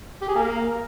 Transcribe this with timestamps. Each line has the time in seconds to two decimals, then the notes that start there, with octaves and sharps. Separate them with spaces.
0.22 G4
0.29 G#4
0.35 A#3